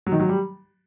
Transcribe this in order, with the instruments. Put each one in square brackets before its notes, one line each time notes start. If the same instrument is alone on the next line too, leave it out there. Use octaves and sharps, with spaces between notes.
[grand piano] F#3
D#3
F#3
G3